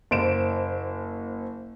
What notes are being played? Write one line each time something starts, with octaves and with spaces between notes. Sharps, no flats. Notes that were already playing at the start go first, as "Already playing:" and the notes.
F#1 C5 D7 E7